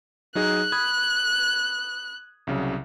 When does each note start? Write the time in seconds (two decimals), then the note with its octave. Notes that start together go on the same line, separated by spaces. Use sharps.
0.35 F#3 D#4 G#4 F#6
0.72 B5 D#6 G#6
2.47 C2 C#3 F#3